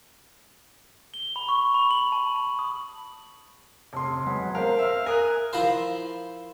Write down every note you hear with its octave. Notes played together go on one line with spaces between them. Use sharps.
G7
B5
C#6
B5
F#7
A5
F#7
D#6
F1 C6
C#3
F#3 G#3 B3
A#4 C5 F5
E5 F6
A#4 G#5 D#6 F#6
F3 E4 F4 A#4 C5